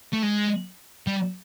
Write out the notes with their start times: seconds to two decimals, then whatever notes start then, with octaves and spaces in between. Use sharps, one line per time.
0.13 A3
0.23 G#3
1.07 G3